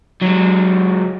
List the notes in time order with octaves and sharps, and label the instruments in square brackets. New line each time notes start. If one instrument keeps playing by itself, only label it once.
[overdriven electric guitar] F#3 G#3